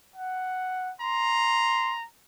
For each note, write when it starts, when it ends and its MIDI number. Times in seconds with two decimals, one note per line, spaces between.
0.16 0.92 78
1.01 2.06 82
1.01 1.94 84